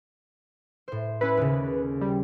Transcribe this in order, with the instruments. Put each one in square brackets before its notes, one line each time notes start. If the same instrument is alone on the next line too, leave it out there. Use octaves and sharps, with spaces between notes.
[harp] A2 C5
[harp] C#4 E4 [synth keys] B4
[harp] D#2 C#3
[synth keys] G3